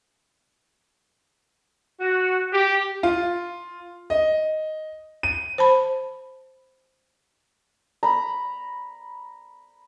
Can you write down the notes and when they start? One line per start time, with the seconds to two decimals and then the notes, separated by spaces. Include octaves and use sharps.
2.01 F#4
2.52 G4
3.03 F4
4.10 D#5
5.23 D#7
5.58 C5 A5 B5
8.03 A#5 B5